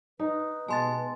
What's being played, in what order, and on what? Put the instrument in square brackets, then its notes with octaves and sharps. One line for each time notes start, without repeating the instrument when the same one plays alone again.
[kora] D#4 [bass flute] B4
[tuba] B2 [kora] G#3 [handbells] A5 C6 A6